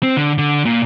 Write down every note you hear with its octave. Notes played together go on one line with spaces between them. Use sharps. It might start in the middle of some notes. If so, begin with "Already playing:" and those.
C4
D3
D3
A#2